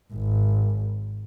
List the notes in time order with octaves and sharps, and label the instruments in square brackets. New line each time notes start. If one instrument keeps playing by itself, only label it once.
[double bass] G#1